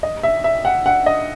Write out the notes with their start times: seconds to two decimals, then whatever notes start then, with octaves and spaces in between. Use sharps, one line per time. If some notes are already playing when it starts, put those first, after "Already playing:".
0.03 D#5
0.23 E5
0.44 E5
0.65 F#5
0.86 F#5
1.06 D#5